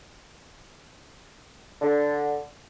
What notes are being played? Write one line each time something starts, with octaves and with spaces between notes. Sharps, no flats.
D3